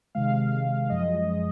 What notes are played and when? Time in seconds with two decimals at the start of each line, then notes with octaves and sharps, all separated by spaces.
0.15 C3 D#3 G#3 F5
0.89 F#2 F3 G#3 D#5